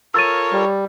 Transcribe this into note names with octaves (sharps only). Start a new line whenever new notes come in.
F4 A4 A#4 C#5 E6 A6 D#7
G3